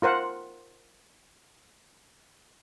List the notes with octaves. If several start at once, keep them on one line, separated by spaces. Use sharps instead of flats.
F4 A#4 C5 F#5